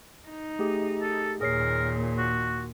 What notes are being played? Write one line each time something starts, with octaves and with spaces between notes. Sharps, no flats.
D#4
A3 G4 G#4
A4
D#2 A#2 G#4 A#4 C#5 C7
F#4